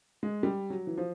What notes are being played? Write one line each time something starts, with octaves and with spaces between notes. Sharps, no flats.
G#3
G3
F#3
E3
F3